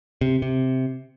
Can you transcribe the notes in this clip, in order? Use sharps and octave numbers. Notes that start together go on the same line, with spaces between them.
C3
C3